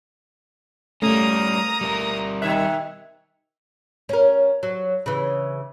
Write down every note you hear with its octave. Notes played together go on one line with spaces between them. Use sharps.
G3 A3 A#3 C#4 A#5 D#6
G3 A#4
B2 D#3 E5 F#6 G#6
C#4 A#4
F#3
C#3 E3